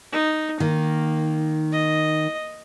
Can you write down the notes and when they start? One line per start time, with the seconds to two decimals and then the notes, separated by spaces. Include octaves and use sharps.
0.13 D#4
0.60 D#3 A#3
1.72 D#5